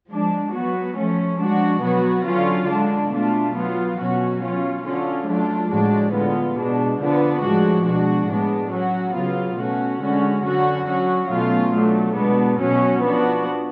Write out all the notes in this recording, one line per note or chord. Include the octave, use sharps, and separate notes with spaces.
F3 G#3 D4
F#3 B3 F#4
F3 A3 C#4
F3 G#3 D4 F#4
B2 F#3 B3 F#4
D3 F#3 C#4 F4
D3 G#3 D4
B2 A3 D4 F4
F#3 B3 F4
B2 F#3 C#4 F#4
F#3 C#4 F4
D3 F#3 C#4 F4
F#3 A3 D4 F4
A2 F3 G#3 D4 F#4
D3 G#3 B3 F4
B2 G#3 D4
D3 F3 B3 D4
A2 F3 G#3 D4 F#4
B2 G#3 D4 F#4
A2 G#3 B3 D4
F#3 C#4 F#4
C#3 F#3 B3 F4
B2 A3 C#4 F#4
D3 G#3 C#4 F#4
D3 F#3 C#4 F#4
F#3 C#4 F#4
B2 F#3 A3 C#4 F4
F#3 A3 D4
B2 G#3 B3 D4
B2 F#3 C#4 F#4
F3 B3 D4 F#4